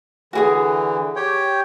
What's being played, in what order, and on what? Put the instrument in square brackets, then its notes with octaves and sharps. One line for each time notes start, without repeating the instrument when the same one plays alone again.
[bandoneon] D3 E3 [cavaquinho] F#4 G#4 D#6
[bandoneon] G4 C#5 G5